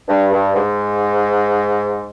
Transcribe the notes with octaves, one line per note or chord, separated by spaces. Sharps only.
G2
G2
G#2